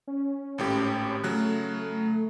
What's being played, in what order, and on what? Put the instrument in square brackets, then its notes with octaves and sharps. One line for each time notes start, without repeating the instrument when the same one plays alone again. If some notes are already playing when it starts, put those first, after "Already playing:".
[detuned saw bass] C#4
[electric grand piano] G#1 A2 G4
[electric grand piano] C#3 F#3 F#6 [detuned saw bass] A3